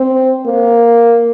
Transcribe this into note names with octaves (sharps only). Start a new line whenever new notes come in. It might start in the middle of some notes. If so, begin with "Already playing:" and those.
Already playing: C4
A#3